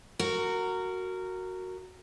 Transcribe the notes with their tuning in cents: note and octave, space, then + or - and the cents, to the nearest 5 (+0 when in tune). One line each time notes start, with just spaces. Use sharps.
F#4 +0 A#4 -15